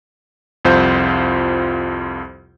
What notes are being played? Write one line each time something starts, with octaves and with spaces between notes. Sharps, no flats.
C2 F2 F4 C5 G6